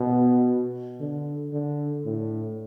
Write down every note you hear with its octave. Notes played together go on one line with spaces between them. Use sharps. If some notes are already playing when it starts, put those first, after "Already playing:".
Already playing: B2
D3
D3
A2